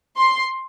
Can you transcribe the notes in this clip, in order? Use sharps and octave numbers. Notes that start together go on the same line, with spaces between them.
C6